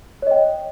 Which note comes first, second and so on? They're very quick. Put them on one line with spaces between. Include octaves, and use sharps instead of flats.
C#5 D#5 G5